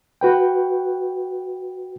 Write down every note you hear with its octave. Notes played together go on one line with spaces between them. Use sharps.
F#4 B4 G5